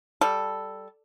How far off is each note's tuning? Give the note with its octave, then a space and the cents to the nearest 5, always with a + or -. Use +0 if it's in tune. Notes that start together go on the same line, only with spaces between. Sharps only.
G3 +0 A4 +0